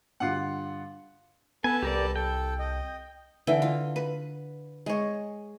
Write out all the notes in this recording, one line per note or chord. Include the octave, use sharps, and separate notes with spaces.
G2 D3 G3 F4 F#5
B3 A4 B4 G#5 A5
C2 G4 A#4 D5
A4 G5
D#5
D3 E3 G5
F4
B4
G#3 C#5